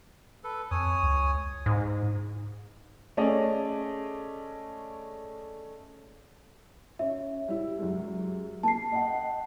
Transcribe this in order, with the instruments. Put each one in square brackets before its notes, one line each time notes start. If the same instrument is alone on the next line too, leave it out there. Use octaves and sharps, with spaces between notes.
[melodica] A4 B4
[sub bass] F2 [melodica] C#5 G#5 D#6
[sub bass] C#2
[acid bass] G#2
[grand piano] A3 C#4 G#4 D5 D#5
[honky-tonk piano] C#4 [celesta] E5
[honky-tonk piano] G3 E4
F#2 G3 G#3
[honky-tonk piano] A#3 [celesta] A5 C7
[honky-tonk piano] D#5 F#5 G5